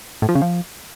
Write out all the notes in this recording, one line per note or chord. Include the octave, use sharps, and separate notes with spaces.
A2
F3
C#3
F3